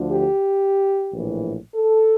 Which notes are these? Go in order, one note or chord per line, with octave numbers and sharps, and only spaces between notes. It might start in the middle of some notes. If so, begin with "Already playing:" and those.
Already playing: D2 D3 F3
G4
A#1 A2 E3
A4